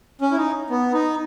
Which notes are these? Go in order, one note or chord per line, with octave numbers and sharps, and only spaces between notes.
C#4
E4
D#4
B3
D#4